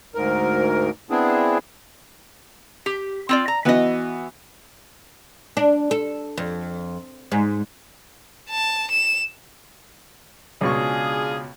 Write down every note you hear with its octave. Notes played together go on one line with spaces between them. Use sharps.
D2 G#2 A#4
B3 C4 D4 E4 G#4
G4
C4 F4 D5
A#5
E3 B3 F#4 B4 D#5
D4
A4
F2
G#2
A5
E7
C#2 B2 D4 F4 G#4 C#6